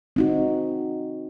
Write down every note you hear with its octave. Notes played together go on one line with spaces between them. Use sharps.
C4 D#4 F#4